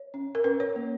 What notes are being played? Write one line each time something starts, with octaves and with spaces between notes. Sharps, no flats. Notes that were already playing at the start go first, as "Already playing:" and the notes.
Already playing: C#5
C#4
A#4
C#4 B4
C#5
A#3